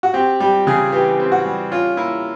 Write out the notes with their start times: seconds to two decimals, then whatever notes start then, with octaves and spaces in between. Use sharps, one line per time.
0.03 F#4
0.14 C4 G4
0.40 G3 G4
0.67 C#3 G#4
0.92 E3 G4
1.20 C4
1.32 F#4
1.45 G3
1.71 C#4 F4
1.97 A#3 E4